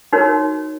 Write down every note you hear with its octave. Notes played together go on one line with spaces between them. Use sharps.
D#4 F#4 A#4 C#5